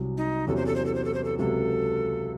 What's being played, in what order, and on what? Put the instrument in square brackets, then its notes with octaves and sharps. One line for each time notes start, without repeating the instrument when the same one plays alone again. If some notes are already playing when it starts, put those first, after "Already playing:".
Already playing: [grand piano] C2 C3 F#3
[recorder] D#4
[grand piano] E2 C3 F#3 C#4 [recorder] A4
[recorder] C5
A4
C5
A4
C5
A4
C5
A4
[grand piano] C#2 C3 F#3 [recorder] A4